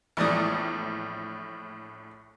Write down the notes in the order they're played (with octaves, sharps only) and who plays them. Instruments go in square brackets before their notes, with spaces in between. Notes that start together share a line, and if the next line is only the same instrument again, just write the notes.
[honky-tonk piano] A#1 A2 [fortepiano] E2 D5 D#6